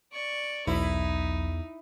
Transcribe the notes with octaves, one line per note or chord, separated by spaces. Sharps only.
D5 C#6
B1 E2 D#4 E4